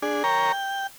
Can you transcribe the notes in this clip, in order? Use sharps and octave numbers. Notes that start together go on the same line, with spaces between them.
D4 G#4
A#4 C#5 G5 A#5
G5